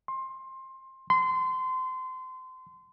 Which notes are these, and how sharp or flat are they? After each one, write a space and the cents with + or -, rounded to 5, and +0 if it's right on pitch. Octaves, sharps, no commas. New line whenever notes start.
C6 +20
C6 -25